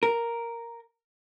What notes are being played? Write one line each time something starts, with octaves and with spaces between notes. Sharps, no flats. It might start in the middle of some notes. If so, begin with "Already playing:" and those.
A#4